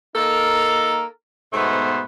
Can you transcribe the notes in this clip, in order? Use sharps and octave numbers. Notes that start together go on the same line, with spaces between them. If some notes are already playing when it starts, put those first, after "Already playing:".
A#3 D#4 A4 A#4
G#2 B2 A3 B3 C5